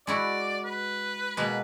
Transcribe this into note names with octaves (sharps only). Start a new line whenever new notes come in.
G#3 E4 F#4 D5
B4
B2 G#3 A#3 B4